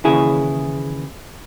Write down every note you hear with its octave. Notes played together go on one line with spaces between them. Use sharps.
D#2 C#3 E3 E4 G#4